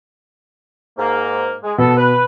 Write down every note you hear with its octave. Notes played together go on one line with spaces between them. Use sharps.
G#2 A#3
G#3
B2 B3 A4
B4